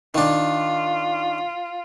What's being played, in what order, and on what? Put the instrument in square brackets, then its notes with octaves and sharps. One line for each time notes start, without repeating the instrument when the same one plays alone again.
[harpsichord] D#3 D4 [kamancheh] F4